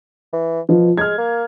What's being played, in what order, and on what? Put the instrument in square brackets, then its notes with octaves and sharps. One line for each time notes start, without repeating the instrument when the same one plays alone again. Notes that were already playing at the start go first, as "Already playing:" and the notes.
[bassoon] E3
[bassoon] B2 [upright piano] F3
[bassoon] G#3 [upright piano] F6 G#6
[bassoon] A#3